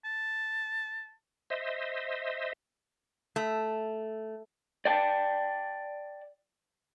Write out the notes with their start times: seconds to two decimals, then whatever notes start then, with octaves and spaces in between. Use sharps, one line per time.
0.05 A5
1.50 C5 D#5 E5
3.36 A3
4.85 D5 G5 A5